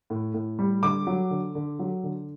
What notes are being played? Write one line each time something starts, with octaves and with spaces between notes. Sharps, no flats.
A2
A2
G3
D3 D6
F#3
D3
D3
F#3
D3